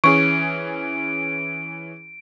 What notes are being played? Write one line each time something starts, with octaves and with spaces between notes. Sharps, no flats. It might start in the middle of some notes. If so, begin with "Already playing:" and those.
E3 C#4 G#4 C#6 D7